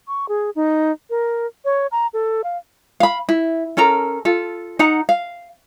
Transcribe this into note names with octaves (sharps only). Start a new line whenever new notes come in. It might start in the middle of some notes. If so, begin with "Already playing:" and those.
C#6
G#4
D#4
A#4
C#5
A#5
A4
F5
F5 B5
E4
C#4 A4 A#4 A#5
F4 A4
D#4 F#5 A#5
F5